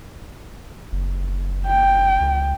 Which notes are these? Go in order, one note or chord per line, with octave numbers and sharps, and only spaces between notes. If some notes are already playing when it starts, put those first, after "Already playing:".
F#1
G5
C#2